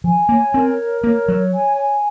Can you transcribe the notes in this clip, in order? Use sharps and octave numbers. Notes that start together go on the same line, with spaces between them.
F3 G#5
A#3 C#5
C4 A#4
A#4
A#3 C#5
F#3 C#5
G#5
G#5